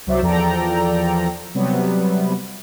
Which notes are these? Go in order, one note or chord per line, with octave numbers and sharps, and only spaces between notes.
C2 F#3 F#4 C5 D5 E5
E2 F3 A4 D5 G5 A#5
C3 F#3 G3 B3